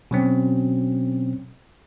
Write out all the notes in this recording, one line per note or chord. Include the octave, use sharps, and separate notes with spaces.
B2 F#3 C4 C#4